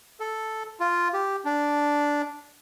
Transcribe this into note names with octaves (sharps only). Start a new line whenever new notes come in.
A4
F4
G4
D4